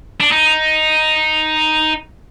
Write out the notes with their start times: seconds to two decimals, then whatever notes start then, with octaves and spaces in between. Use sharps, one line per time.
0.21 D4
0.32 D#4